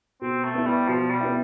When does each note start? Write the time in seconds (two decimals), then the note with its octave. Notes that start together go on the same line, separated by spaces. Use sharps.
0.22 B2 C4
0.44 A3
0.55 B3 E4
0.66 G3
0.88 B2 F3
1.11 G3
1.21 B3 E4